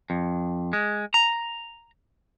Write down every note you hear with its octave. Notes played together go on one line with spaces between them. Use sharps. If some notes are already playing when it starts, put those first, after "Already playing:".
F2
G#3
A#5